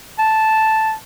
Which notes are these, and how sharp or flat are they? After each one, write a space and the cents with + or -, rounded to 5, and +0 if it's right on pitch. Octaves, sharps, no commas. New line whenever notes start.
A5 -5